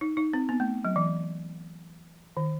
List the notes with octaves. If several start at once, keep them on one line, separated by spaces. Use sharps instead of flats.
D#4
D#4
C4
B3
A3
F#3
E3
D#3